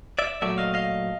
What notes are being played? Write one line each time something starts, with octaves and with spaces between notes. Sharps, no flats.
D5 E5
A#2 F#3 A3 D5 E5
D#5 F5
D#5 F5